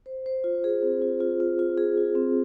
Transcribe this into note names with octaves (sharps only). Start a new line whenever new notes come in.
C5
C5
F4
G#4
C4
F4
F4
F4
F4
G#4
F4
C4